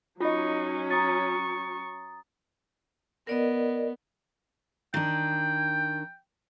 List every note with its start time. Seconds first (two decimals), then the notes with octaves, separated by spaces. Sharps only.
0.20 F#3 C#4 D#4 F4 D#5 C#6
0.90 A#5 C#6 D#6 A6
3.27 B3 A#4 D5 D#5
4.94 D#3 D4 G5